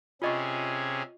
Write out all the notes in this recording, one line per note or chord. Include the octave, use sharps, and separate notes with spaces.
C3 C#4 F4 G#4 D#5 C#6